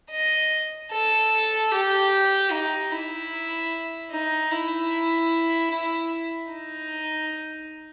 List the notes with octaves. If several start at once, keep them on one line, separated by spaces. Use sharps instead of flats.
D#5
A4
G4
D#4
E4
D#4
E4
E4
D#4